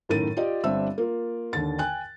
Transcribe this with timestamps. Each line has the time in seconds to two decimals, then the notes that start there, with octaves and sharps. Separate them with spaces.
0.09 F#2 A2 D#3 A#4 A6 D#7
0.37 F4 G4 D5 D#5
0.64 G1 G3 C4 D4 E5 E6
0.98 A#3 F4
1.53 D#2 D3 A6
1.78 G5 G#5 F#6